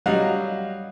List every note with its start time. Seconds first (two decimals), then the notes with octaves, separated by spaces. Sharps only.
0.06 F#3 G3 D#5 F5 F#5